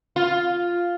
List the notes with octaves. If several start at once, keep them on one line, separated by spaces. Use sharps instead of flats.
F4